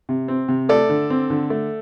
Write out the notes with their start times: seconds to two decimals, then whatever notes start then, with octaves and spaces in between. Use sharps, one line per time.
0.09 C3
0.28 C4
0.48 C3
0.69 A3 A4 D5
0.89 D3
1.10 C4
1.30 D3
1.50 A3